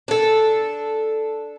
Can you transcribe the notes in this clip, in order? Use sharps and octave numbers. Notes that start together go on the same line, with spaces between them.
D4 A4